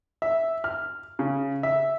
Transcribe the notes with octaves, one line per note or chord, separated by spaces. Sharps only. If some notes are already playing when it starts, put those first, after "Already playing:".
E5
F6
C#3
E5